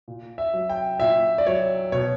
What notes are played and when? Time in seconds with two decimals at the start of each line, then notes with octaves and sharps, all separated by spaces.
0.08 A#2
0.38 E5
0.53 F#3
0.69 G5
1.00 A#2 E5
1.38 D5
1.47 F#3 C#5
1.92 B2 C#5